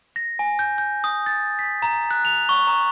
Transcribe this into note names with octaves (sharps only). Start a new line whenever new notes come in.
A#6
G#5
G6
G6
D#6
A6
B6
A#5
F#6
F7
C#6
A#5